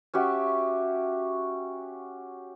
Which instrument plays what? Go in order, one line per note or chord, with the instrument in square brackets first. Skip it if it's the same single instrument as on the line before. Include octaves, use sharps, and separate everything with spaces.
[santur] C#4 F#4 G4 E5